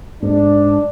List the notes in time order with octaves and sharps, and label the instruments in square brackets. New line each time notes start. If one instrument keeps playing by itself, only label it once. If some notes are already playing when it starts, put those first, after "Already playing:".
[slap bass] G#2 [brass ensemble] D4